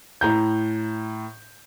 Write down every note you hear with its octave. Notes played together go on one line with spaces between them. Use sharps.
A2 A#5 G6